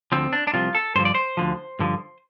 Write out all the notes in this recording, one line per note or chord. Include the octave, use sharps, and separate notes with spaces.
D2 D3 F3 C4
D4
D4
C2 C3 F3 F4
A4
G2 D3 F3 C5
D5
C5
D2 D3 F3
G2 D3 F3